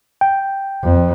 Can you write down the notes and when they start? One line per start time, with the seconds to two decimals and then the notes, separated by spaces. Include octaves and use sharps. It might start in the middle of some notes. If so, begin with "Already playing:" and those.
0.21 G5
0.83 F2